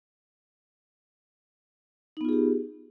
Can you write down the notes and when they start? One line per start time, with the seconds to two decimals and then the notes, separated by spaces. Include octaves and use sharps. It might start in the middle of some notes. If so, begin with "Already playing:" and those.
2.17 D#4
2.21 B3
2.25 F4
2.29 G#4
2.33 G4